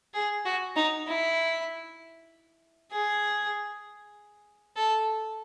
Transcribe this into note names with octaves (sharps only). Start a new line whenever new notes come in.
G#4
F#4
D#4
E4
G#4
A4